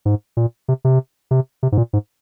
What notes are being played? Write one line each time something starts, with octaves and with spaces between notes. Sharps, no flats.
G#2
A#2
C3
C3
C3
C3
G#2
A#2
G#2